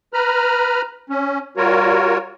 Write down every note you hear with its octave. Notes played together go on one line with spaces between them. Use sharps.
B4 A#5 B5 F6
C#4
G3 F4 F#4 A#4 C#5